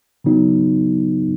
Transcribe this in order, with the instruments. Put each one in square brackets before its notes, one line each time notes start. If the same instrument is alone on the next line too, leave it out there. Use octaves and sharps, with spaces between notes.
[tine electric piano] C#3 F#3 B3 D#4